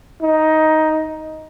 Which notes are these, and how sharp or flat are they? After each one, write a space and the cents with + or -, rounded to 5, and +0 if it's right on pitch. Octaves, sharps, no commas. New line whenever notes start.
D#4 +10